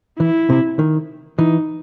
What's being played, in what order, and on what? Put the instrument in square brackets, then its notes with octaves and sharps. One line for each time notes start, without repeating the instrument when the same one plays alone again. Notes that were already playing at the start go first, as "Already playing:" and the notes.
[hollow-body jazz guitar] E3 [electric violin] E4
[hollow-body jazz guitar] C3
D#3
[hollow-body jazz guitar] E3 [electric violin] D#4